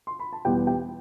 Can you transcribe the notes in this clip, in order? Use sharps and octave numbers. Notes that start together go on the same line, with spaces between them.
C6
B5
A5
E2 B2 G3 B3 G4 G5
G4 G5